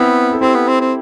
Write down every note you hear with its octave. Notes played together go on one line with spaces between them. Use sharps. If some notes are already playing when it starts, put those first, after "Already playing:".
Already playing: B3 C4 E4
A4
C4 E4 G4
B3
C4
C4